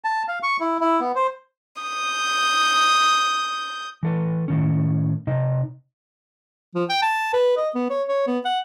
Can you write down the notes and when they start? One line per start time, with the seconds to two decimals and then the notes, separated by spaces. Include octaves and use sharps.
0.04 A5
0.28 F5
0.43 C#6
0.60 E4
0.81 E4
1.00 B3
1.15 C5
1.81 D#6 G6
4.03 E3 A4 B4
4.48 A2 D#3 C#4
5.27 C3 D#4 D#5
6.75 F3
6.89 G5
7.02 A5
7.33 B4
7.57 D#5
7.75 B3
7.90 C#5
8.09 C#5
8.27 B3
8.45 F#5